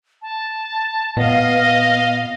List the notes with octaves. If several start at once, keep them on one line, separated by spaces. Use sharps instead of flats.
A5
A#2 B3 D#5 F5